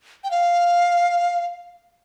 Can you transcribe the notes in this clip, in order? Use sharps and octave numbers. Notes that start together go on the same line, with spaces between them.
G5
F5